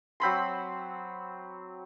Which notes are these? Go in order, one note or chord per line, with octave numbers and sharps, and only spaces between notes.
F#3 C4 B5 C6